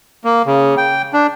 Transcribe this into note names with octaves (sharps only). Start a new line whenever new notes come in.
A#3
C#3
G5
D4